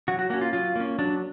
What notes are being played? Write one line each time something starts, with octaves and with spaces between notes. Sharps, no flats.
F#3 F#4
F#4
A#3 C#4 F#4
F4
F#3 F4
A#3 C#4
F#3 D4